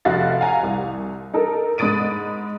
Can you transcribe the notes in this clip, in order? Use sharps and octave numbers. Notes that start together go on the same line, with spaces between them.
F1 F#4 E5 F5 A6
F5 F#5 G#5 A#5
C2
D#4 A4 A#4
G#2 B5 D#6 A6 D7 D#7